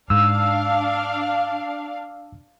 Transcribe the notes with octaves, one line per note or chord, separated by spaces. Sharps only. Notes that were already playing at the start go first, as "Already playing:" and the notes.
G#2 D4 F5 E6